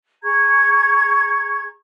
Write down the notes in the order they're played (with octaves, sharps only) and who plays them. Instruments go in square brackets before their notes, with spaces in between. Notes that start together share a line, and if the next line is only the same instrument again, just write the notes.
[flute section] G#4 A#5 C#6 G#6